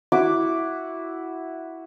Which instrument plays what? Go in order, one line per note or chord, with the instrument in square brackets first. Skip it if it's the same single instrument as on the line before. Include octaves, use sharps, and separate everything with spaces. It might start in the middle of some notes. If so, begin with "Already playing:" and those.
[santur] E4 F#4 D6